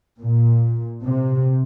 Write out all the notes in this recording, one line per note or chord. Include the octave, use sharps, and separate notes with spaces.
A#2
C3